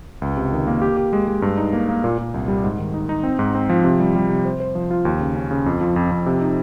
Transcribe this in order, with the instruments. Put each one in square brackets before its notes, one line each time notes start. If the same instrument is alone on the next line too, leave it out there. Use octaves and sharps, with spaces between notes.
[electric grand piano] C#2
C3
D#3
A#3
G4
G4
G#3
G#3
G2
D#4
A#3
A#3
A#2
A#2
C2
G3
G#2
D#3
D#4
D#4
C4
G#2
C4
F3
C3
G3
G3
C3
C5
C5
F3
F4
D#2
C#3
C#4
C#3
F2
F3
F2
F2
C3
D#4